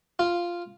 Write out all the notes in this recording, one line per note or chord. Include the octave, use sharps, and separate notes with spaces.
F4